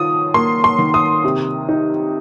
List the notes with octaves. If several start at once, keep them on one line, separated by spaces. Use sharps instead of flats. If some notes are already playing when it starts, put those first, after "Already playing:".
Already playing: D#3 F4 D#6
A#3 C6
C6
D#3
D#6
C3
D#4